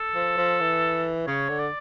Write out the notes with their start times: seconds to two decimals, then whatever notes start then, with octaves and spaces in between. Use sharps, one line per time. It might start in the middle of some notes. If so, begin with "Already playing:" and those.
Already playing: A4
0.15 F3
0.37 F3
0.60 E3
1.27 C#3 C#5
1.49 D3
1.59 D5